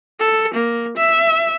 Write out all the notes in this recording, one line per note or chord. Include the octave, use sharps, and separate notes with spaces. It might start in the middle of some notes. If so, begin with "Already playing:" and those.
A4
A#3
E5